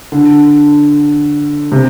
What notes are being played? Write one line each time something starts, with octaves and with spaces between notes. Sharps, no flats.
D3
C3